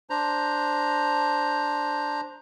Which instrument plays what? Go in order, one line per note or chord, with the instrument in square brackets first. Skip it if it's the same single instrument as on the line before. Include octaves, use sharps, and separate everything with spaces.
[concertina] D4 C5 A#5